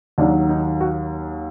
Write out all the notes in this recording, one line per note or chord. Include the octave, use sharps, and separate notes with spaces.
D#2 D#3 F#3 D4
D#4
F#4